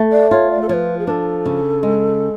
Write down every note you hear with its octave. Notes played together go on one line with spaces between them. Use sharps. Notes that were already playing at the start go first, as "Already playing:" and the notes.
Already playing: A3
D5
F4 C#5
D5
A4
F3 B4 C#5
G#4
D4 A4 B4
C#3
G#3